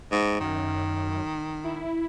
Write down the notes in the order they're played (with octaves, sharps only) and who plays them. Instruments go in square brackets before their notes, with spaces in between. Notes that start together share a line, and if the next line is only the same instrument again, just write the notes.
[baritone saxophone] G#2
[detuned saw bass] F#2 [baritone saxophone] D#3
[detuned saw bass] E4